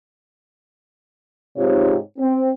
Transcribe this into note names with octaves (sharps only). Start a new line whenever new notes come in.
G#2 C3 D#4 F4 G4 C#5
C4